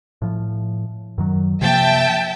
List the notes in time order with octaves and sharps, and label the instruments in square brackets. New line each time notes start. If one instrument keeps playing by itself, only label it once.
[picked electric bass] A2 F3
F#2 D#3 F#3
[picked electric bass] C3 F3 A#3 [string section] E5 G5 A5